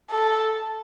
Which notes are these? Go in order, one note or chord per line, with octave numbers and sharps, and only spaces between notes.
A4